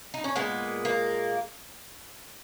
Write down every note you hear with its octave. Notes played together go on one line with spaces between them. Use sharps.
D#4
C#4
A#2 G#3 B3
A#3